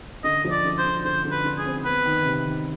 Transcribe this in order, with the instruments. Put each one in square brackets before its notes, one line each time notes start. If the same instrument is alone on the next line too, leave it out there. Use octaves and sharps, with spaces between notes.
[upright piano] D3 [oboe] D#5
[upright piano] F3
[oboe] D5
[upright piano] D3
[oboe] C5
[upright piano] D3
[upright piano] D3 [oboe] C5
[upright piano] D3
[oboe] B4
[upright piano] D3
[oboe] G#4
[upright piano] C4
[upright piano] B3 [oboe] B4
[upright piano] D#3
C3
D#3